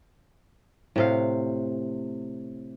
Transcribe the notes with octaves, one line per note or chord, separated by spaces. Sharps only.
A2 C3 F5